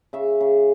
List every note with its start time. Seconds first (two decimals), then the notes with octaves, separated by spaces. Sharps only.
0.13 C#3 E5
0.41 C#3